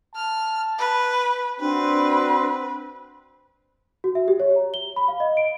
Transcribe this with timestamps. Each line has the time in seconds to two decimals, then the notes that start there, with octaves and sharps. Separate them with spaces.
0.16 A5 F6
0.78 B4
1.60 C4 D4 F#4 B4
4.04 F#4
4.15 E5
4.28 G4
4.40 C#5
4.56 A#5
4.74 G7
4.96 B5
5.08 F5
5.20 D#5
5.37 D7